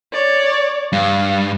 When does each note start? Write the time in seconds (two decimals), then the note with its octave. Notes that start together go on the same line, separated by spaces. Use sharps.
0.13 C#5 D5
0.93 G2 F5